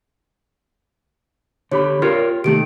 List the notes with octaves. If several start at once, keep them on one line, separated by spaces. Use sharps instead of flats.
D3 G4 C#5 B5
F4 G4 A#4 C#5
C3 D#3 A3 G4 D7